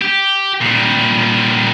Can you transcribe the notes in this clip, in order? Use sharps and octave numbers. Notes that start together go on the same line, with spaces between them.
G4
A#2 G3